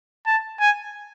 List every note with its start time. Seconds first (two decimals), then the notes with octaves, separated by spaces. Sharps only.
0.26 A5
0.60 G#5